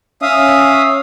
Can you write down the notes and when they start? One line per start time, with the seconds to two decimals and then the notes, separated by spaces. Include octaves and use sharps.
0.22 C#4 E5 F5 D#6